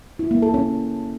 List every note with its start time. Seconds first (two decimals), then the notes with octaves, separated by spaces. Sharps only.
0.19 E4
0.31 A#3
0.42 A4
0.54 C#4